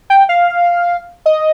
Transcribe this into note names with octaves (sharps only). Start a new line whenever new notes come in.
G5
F5
D#5